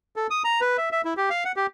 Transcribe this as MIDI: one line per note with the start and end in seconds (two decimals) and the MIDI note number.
0.16 0.27 69
0.30 0.43 87
0.45 0.61 82
0.61 0.77 71
0.78 0.89 76
0.92 1.01 76
1.05 1.14 64
1.17 1.29 67
1.30 1.44 77
1.45 1.52 78
1.56 1.67 67